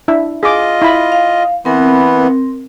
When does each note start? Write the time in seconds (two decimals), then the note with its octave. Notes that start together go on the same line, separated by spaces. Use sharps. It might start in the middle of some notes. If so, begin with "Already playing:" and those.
0.08 D4 E4 E5
0.43 F4 G#4 D#5 D6
0.82 E4 B5
1.12 F5
1.65 E3 B3 C4 A#4